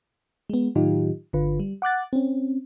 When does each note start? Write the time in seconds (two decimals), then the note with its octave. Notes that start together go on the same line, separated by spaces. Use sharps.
0.49 G#3 B3
0.76 A2 D#3 F#3 D#4 F4 G4
1.33 G1 D3 F4 B4
1.60 G3
1.82 F#5 D6 F#6 A6
2.13 C4 C#4